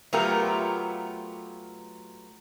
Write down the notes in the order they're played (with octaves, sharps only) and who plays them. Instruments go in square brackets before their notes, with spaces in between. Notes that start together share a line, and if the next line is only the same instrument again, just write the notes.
[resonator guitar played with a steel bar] F#3 A3 B3 F4 G4 A#4